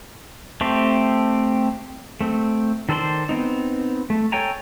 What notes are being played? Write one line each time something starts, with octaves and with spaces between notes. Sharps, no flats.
A3 C4 G4
A3 C4
D#3 A4 C5 D5 C6
B3 C4 D#4
A3
A4 C#5 G5 G#5 A#5